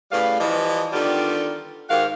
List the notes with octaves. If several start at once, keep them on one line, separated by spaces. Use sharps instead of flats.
A2 C#3 G3 B4 F5
E3 F3 G3 D#5
D3 D#3 G3 B3 F4 G4
G#2 D#3 F#4 G4 A#4 F5